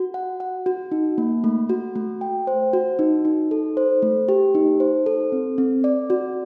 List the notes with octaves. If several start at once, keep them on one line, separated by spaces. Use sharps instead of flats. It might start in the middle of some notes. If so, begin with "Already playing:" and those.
Already playing: F#4
F#5
F#5
F#4
D#4
A#3
A3
F#4
A3
G5
C5
F#4
D#4
D#4
A4
C5
A3
G4
D#4
C5
A4
C4
C4
D5
F#4